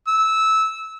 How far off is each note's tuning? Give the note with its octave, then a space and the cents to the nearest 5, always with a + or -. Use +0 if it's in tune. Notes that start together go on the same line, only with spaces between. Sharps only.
E6 -15